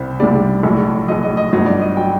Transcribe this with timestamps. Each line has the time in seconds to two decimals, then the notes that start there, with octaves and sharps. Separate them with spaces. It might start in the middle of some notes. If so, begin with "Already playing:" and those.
Already playing: C2 C3 G3 C5
0.20 C2 C3 G3 D5
0.63 A#1 A2 F#3
1.08 A#1 A2 F#3 D#5
1.23 D#5
1.37 D#5
1.52 G1 G2 F#3 D#5
1.66 D5
1.81 D#5
1.97 F#3 G5